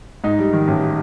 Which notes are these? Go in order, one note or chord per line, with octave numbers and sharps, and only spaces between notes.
G#2 D#4
G3
D#3
A1